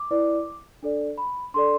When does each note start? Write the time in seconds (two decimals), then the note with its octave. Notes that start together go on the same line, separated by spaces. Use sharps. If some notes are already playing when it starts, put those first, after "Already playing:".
Already playing: D6
0.11 E4 B4 D5
0.83 D4 A4 D5
1.18 B5
1.54 D4 A4 D5 C6